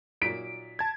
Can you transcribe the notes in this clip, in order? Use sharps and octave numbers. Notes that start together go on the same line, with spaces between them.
A#2 F#3 D#4 B6 D7
A5 G#6